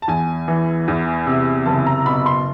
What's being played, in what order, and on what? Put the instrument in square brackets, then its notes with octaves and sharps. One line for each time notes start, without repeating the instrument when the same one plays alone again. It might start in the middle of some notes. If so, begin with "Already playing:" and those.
[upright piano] A5
E2 G#5
E3
E2
C3
F#1 A5
A#5
B2 B5
C6